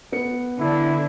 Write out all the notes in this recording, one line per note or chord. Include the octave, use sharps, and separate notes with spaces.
B3 C#7
D3 E4